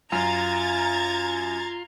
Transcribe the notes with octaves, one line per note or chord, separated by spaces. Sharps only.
F#2 F4 A#5 G#6 A6